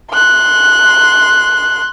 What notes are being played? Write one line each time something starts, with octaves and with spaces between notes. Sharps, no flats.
C6 F#6